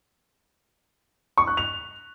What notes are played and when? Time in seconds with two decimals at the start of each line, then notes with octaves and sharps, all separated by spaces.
1.38 C#6
1.47 F#6
1.57 F7